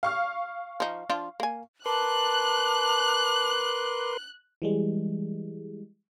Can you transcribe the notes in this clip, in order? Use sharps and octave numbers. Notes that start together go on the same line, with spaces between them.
F5 C#6 F6
F3 D#4
F3 D4 F4
A#3 G#5
A#4 B4 A5 C6 D6 F#6
E3 G3 G#3